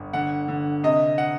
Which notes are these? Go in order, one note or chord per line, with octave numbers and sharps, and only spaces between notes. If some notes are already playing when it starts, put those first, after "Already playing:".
Already playing: G1
D3 F#5
D3
C3 D#5
F#5